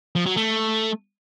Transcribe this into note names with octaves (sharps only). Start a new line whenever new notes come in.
F3
F#3
A3